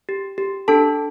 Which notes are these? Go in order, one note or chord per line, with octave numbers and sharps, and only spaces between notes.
G4
G4
D4 A4 A5